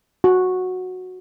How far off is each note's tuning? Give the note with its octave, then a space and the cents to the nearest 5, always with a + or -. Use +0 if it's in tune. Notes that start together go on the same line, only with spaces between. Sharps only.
F#4 -10